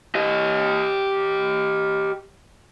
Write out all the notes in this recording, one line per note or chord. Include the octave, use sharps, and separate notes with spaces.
G4 D#5